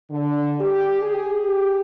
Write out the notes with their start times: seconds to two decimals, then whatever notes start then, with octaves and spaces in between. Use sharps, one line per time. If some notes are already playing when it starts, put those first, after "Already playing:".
0.10 D3
0.59 G4
1.01 G#4
1.43 G4